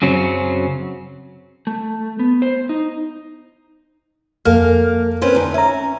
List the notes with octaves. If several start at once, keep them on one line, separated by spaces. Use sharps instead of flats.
F#2 C#3 F#3 C4 C#4
A3
B3
C5
D#4
F2 A#3 A4 F6
C4 C#4 B4
D2 D#3
C#4 E5 A#5